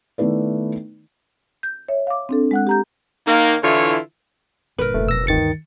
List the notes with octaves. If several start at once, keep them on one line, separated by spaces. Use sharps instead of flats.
D#3 A3 B3 E4 B4 D5
G6
C#5 E5
F5 D6
C4 D4 A4
G#3 F#5 F#6
G4 A#5 G6
D#3 A#3
D3 E3 E4 F4 C#5
G1 G2 A#2 A#4 B4
F1 A3
B2 F#3 E6 A#6
D2 G2 D#3 A6 C#7